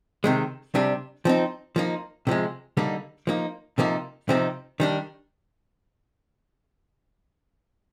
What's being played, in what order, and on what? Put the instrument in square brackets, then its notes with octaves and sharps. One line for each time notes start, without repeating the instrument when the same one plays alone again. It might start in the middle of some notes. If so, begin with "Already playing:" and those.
[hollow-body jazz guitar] C3 D#3 G#3
C3 G3 D4
F3 C4 D#4
F3 A#3 D#4
C3 F3 G#3
D3 G3 A#3 D#4
F3 A#3 D#4
C3 F3 A#3 D#4
C3 F3 C4 D#4
D#3 G3 D4